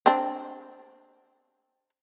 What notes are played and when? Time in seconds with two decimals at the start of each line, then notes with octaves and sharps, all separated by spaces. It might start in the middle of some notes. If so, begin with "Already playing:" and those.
0.06 C4 D4